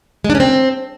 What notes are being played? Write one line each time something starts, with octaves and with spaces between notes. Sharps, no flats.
G#3
D4
C#4
C4